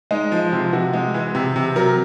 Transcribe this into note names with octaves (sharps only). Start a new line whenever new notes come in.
G#3 D#4
F3
C3 F4
C3 F#4
G#3
E3
C3
C3
F#3 A#4